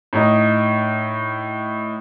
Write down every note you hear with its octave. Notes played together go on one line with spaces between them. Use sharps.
A2 D#4